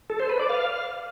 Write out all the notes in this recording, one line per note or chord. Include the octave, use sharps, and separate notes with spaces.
A4
C5
B4
D5
F5